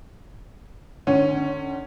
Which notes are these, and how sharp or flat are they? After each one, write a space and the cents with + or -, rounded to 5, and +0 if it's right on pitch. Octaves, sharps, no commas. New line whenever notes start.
D3 +35 C#4 +0